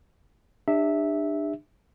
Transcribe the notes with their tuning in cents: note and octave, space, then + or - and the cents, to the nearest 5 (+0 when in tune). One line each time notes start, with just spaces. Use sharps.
D4 +30 G4 +40 E5 -10